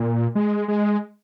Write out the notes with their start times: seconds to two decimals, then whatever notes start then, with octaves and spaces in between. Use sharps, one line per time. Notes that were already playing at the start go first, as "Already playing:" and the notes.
Already playing: A#2
0.35 G#3
0.68 G#3